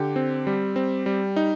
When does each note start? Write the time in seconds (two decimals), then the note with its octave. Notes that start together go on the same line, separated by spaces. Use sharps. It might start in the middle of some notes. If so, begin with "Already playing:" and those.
Already playing: D3 G4
0.16 C4
0.47 G3
0.76 C4
1.06 G3
1.36 D#4